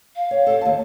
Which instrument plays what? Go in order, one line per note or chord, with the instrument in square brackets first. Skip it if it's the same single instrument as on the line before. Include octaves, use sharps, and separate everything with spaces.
[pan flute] F5
[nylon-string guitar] C#5
G4 A4
D#2 A5